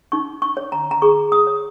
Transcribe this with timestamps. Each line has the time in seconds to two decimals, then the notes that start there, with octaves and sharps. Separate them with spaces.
0.12 D#4 C#6
0.42 C#6
0.57 C#5
0.72 A#5
0.91 A#5
1.02 G#4 C#6
1.32 D#6
1.47 C#5